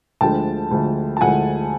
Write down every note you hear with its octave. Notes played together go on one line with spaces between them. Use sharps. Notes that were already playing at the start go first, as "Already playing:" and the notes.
D2 D3 F3 G#3 G5 A5
D2 D3 F3 G#3
A5
D2 D3 F3 G#3 F#5 G#5